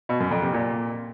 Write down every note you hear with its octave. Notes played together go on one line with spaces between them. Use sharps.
B2
F#2
F2
C3
A#2